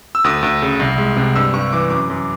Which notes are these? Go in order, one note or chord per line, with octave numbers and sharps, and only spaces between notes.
E6
D2 D#6
D2
C#3
C2
G#3
C3
G2 E6
G2 C#6
E3 D6
F#2 D6
F#2